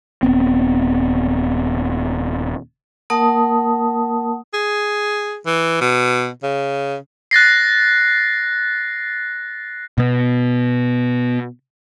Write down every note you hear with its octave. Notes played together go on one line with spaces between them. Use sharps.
D#1 B3 C4
A#3 A#4 F#5 A5 D#6
G#4
E3
B2
C#3
F#6 A6 A#6 C7
B2 B3